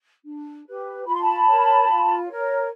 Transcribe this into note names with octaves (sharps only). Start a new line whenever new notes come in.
D4
G4 B4
F4 B5
C6
A5 B5
A#4 C#5
F4
A#4 C#5